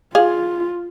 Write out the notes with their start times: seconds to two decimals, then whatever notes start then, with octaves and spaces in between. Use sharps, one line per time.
0.15 F4 G#4 F5